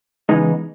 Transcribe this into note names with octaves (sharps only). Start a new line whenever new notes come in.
C#3 E3 G#3 B3 D#4